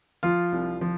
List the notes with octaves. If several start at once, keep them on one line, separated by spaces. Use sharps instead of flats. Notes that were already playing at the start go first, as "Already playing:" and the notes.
F3 F4
C2
F3